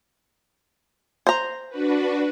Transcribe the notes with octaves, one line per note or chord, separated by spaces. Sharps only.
C5 A#5
D4 F#4 B4